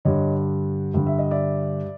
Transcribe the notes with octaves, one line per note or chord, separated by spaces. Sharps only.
G2 D3 C#5 D#5
G2 D3
E5
D#5
D5 E5